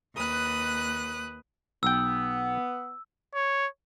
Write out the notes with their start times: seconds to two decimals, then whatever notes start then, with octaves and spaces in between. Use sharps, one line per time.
0.16 D#2 B4 D#6 F#6
1.83 B1 B3 G5 E6
3.34 C#5